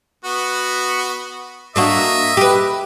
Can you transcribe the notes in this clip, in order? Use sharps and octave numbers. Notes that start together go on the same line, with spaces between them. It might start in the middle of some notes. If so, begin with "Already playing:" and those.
B3 F#4
A#3 D4 F#4 D#5 E5
G4 B4